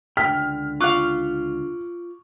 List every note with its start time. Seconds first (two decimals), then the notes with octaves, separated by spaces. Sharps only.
0.17 C#2 D3 G5 F6 B6
0.80 F4 F5 C#6 D6 F#6